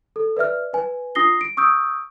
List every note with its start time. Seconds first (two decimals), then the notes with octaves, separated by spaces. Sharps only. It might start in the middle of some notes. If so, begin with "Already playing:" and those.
0.16 A4
0.37 B4 D5 E5 F6
0.73 B4 G#5
1.15 D4 F4 D#6 A#6 C7 G7
1.41 D7
1.57 C#6 D#6 E6 G6 D7